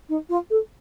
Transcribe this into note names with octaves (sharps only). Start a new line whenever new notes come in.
D#4
F4
A4